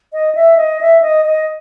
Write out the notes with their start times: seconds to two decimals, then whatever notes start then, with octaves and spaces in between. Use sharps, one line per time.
0.13 D#5
0.35 E5
0.57 D#5
0.81 E5
1.02 D#5
1.25 D#5